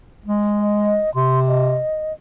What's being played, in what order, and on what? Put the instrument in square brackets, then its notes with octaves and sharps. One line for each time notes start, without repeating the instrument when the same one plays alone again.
[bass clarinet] G#3
[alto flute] D#5
[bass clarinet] C3 [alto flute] C6
[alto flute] D#5